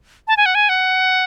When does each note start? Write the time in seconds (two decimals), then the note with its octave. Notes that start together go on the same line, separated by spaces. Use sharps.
0.28 A5
0.37 G#5
0.46 F#5
0.55 G#5
0.69 F#5